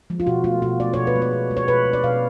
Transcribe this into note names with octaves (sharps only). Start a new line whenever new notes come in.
F3 G#3
F4
B2 F#4
A3 F4
B2 F#4
A3 D5
B2 C#5
B4
G#3
C#5
B2
G#3
C#5
B2 B4
G#3
D5
B2 F5